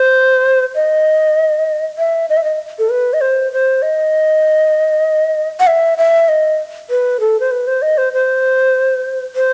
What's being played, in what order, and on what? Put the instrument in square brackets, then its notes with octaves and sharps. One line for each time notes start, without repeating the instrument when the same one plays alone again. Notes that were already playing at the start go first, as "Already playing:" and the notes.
Already playing: [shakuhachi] C5
D#5
E5
D#5
E5
D#5
A4
B4
D#5
C5
C5
D#5
F#5
E5
E5
D#5
B4
A4
C5
B4
C5
D#5
C5
C5
C5